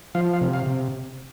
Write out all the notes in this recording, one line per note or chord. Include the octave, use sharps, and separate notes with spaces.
F3 F5
F5
C3
F5
C3